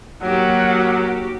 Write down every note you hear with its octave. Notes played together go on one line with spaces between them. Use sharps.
D#2 F#3 F#4 G4 A#4 F#5